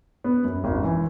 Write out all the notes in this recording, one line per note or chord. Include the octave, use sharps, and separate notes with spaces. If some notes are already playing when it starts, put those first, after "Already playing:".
B3
F#2
G#1
E3